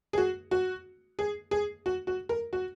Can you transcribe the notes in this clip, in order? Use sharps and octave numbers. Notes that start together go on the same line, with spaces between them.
G#4
F#4
F#4
G#4
G#4
F#4
F#4
A#4
F#4